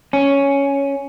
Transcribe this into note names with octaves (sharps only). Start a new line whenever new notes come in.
C#4